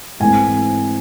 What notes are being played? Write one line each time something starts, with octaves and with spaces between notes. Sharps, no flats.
G#2 E3 A3 C4 G#5